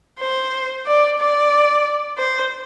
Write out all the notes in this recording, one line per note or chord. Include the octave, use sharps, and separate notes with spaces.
C5
D5
D5
C5